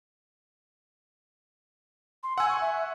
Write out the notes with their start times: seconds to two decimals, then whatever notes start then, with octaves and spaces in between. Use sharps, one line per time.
2.23 C6
2.38 F#5 G#5 E6
2.49 C#6
2.61 E5